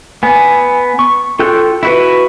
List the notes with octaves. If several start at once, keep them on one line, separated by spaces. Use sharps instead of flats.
B3 G#5
C#6
F4 A4 G5 F#6 G6
E4 F#4 B4